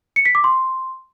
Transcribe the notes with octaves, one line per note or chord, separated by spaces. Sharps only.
C#7
B6
D6
C6